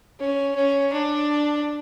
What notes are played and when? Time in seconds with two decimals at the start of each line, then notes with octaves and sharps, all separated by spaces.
0.20 C#4
0.55 C#4
0.93 D4